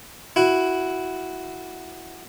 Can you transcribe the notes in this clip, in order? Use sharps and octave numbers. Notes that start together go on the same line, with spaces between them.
E4 F#4